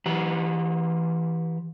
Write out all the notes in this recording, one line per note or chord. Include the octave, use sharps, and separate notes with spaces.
E3 G4 F#5